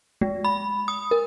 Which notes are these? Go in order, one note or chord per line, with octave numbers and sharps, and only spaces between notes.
G#3
B5
D#6
A#4